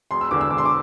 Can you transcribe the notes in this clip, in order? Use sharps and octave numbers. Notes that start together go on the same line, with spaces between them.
E1 C6
E6
E2 D3 D6
E6
E1 D6
C6
D6